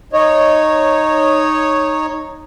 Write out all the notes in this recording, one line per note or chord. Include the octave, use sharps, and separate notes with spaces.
D#4 C#5